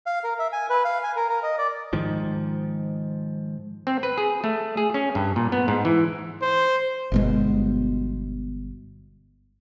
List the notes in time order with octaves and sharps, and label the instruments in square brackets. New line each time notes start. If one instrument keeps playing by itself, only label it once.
[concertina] F5
A#4
E5
G#5
B4
F5
G#5
A#4
A#4
D#5
D5
[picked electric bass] G#2 D#3 F3
[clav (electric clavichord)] C4
B4
G#4
A3
G#4
C#4
G2
A#2
B3
G#2
E3
[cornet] C5
[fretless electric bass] G1 B2 G#3